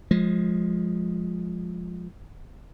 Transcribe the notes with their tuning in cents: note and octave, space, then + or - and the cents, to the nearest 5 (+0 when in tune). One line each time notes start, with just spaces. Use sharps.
F3 +15 G#3 +0